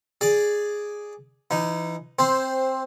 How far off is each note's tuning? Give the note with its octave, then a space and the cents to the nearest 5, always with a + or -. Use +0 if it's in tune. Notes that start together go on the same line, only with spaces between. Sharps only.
G#4 +0 D5 +0
E3 +25 D#4 +0
C4 +10 C5 +0